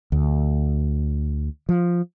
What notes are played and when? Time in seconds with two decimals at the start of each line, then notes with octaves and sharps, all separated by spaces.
0.12 D2
1.69 F3